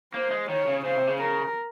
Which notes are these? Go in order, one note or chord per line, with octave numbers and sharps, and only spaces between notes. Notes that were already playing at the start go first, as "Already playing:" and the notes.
A#3 C5
G#3
D#3 C#5
C#3
C#3 C5
C3
C#3
A#4